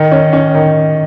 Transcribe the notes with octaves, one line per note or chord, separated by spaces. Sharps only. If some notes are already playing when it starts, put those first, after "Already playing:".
Already playing: D#3
C#4
C#4
D#3